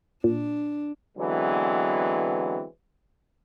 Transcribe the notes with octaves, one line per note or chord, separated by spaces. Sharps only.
A#2 D4
D3 E3 F#3 G#3 B3 C4